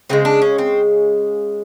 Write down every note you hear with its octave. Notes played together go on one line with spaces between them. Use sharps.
C#3 E3 G#3 C4
D4
C#4
C4